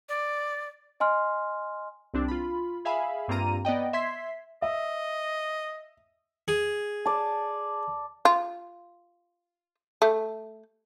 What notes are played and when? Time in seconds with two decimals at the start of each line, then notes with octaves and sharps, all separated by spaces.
0.09 D5
1.00 D#5 G#5 C6 F6
2.14 C2 C4 D4
2.28 F4 B5
2.85 G#4 E5 F5 G#5 B5
3.28 G2 A#3 C4 F4 A#5 D#7
3.65 B3 D5 D#5 G5
3.93 E5 C6 G#6 B6 C7
4.62 D#5 E5
6.48 G#4
7.05 D5 A5
8.25 F4
10.02 A3